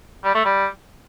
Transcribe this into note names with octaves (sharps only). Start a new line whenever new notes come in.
G3
A3
G3